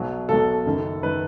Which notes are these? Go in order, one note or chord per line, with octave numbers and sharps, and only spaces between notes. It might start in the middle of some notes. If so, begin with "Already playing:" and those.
Already playing: B1 B2 F#3
B1 B2 F#3 A4
F#1 F#2 D#3
F#1 D#3 B4